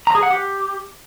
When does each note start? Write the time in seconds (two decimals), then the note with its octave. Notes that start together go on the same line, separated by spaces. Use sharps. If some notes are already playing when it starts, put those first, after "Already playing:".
0.07 A#5
0.15 G#4
0.23 F#5
0.30 G4